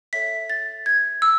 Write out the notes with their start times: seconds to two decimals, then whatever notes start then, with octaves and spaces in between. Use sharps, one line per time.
0.13 A4 C#5 E5 B6
0.50 A6
0.86 G#6
1.22 E6